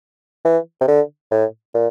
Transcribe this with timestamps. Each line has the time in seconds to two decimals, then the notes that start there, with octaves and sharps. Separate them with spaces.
0.45 E3
0.81 C3
0.88 D3
1.32 A2
1.74 A#2